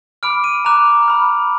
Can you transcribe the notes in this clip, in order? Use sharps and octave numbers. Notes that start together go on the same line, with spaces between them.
B5 D6 F6 D7
D#7
A#5 D6 F#6 F7
B5 F6